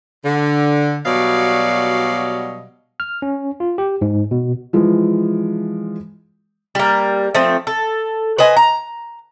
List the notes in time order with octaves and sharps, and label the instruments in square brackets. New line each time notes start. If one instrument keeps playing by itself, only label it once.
[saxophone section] D3
B2 F#3 G3 D5 D#5 F5
[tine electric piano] F6
C#4
F4
G4
G#2
B2
[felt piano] E3 F3 G#3
[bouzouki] G3 A#3
F3 A3 C4
A4
B4 C5 D#5 G#5
A#5